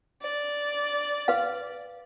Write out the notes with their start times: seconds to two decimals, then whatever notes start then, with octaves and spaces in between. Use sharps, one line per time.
0.21 D5
1.28 B4 F5